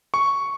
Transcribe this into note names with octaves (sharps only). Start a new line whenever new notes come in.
C#6